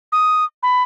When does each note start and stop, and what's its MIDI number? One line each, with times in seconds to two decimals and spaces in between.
0.12 0.44 87
0.63 0.83 83